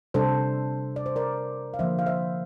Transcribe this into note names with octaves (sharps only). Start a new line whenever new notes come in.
C3 G3 D4 A4 C5
D5
C5
A#4 D5
F5
D3 F3 A#3 C5 E5
F5
C5 E5